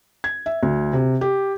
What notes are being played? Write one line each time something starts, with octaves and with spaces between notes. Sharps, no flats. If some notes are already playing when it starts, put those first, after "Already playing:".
G#6
E5
D2
C3
G4